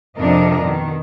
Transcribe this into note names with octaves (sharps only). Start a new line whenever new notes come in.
F2 C3 F3 D4 A#4 D#5
B2 D#3